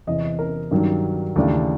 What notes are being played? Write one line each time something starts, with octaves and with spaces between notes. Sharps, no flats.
E2 C3 E3 D#5
A#4
G2 D#3 F#3
D#2 C#3 E3 A3 D4